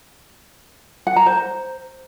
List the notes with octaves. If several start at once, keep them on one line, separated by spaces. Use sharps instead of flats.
F#5
A#5
C5